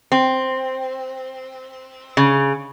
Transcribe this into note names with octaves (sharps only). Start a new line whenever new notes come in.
C4
C#3